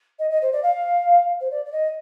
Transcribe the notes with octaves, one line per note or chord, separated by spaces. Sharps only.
D#5
D#5
C5
D5
F5
C5
D5
D5
D#5